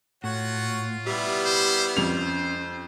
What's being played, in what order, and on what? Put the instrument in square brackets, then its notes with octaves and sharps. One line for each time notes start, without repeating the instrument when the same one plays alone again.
[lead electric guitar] A2 [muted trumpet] F4 [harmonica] F#4 C#5 F#5
[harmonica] G3 B3 E4 [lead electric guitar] G4 E5
[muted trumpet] C5
[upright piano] F2 F7 [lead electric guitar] C#4 [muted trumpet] C5